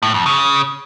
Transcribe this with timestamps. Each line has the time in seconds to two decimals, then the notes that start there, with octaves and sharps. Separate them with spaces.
0.03 A2
0.14 F2
0.26 C#3